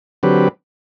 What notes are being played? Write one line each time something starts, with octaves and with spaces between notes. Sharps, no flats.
D3 F#3 C4 G4 B4